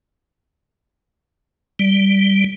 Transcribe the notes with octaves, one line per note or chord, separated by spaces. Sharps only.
G3